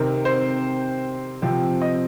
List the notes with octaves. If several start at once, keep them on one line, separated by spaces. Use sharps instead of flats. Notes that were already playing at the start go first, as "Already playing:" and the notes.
Already playing: C3 D#3 C4 A#4
C5
C3 F3 C4
D#5